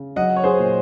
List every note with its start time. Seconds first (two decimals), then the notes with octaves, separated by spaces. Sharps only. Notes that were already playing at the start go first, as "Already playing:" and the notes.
Already playing: C#3
0.16 F#3 D#5 F#5
0.36 C#5
0.44 G#4 C5
0.59 A#2